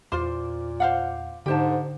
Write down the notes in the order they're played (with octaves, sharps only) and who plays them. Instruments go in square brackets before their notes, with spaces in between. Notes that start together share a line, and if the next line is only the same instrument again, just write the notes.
[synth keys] E2 D6 [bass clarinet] A#2 [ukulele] F4 C5
[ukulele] C5 F5 F#5
[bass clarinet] G#2 [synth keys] D3 [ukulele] G4 C5 A5